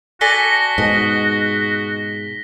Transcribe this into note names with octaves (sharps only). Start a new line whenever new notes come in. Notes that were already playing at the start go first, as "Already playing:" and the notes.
F#4 A4 D5 G#5 A#6 B6 G7
G#2 B2 D#5